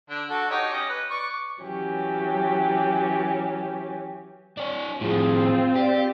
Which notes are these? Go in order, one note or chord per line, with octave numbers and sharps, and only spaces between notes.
D3 D4
F#4 A4
D#4 G4 C#5
C#4 D#5
B4
D5 C#6
E3 F#3 C#4 G4
D4 C#5
A2 F3 C4 F4 G#4
G4 D5